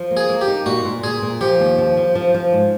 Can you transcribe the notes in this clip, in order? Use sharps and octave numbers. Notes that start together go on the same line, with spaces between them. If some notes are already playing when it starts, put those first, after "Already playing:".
Already playing: F3
A#3
G#4
A#3
G4
D#4
A#2 F#4
A#2
A#2 G#4
A#2
F3 G4
D#2
F3
F3
F3
F3
G#2